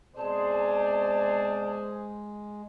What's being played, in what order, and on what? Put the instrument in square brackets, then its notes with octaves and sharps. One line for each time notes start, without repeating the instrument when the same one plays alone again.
[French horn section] B2 C4 D5 [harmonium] G#3 [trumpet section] G#4 C5 [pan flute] A5